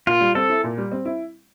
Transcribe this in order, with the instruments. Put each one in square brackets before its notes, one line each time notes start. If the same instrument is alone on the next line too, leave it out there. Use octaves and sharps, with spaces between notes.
[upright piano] A#2 [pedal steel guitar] F4
[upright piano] G3
[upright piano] C4 [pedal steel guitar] A4
[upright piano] E4
A#2
G3
C4
E4